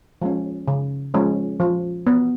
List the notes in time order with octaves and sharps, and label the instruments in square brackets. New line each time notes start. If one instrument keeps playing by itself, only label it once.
[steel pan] F3 G#3 C#4
C#3
F3 G#3 C#4
F3
B3